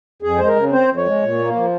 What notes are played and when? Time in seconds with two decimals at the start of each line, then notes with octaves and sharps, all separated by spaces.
0.22 F2 G#4
0.38 G#3 C5
0.47 A#4
0.56 C#3
0.72 C4 C5
0.89 F2
0.97 C#5
1.06 G#3
1.23 A#2
1.39 A#3
1.56 F3